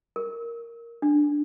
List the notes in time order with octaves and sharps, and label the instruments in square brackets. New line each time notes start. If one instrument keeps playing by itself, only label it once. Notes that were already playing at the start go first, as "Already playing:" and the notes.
[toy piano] A#4
D4